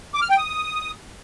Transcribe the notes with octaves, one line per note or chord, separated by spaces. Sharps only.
D6
F6
G5
D#6